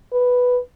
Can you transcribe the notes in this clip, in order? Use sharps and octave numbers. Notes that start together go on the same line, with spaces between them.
B4